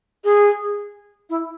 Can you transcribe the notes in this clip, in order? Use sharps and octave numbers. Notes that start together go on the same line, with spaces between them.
G#4
E4